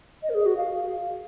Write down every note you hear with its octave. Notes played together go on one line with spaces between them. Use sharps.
D#5
A#4
G#4
F#4
F5